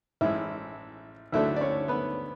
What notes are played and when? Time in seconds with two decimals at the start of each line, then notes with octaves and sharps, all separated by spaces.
0.21 A1 A2 G#3 E4 E5
1.32 D2 D3 F#3 A3 D4 E4 E5
1.56 D5
1.61 C#4 C#5
1.88 B3 B4